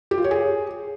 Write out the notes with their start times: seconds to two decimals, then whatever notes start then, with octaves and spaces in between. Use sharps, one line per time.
0.11 G4
0.18 F4
0.24 C#5
0.31 G#4